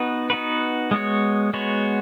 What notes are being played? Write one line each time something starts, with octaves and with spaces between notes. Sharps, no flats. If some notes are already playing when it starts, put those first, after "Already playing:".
Already playing: B3 D#4 F#4 B4
B3 D#4 F#4 B4
G#3 B3 F#4 C#5
G#3 B3 F#4 C#5